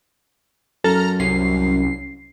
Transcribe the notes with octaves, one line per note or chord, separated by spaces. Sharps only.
F#2 A4 A#5 F6
C2 C#4 C7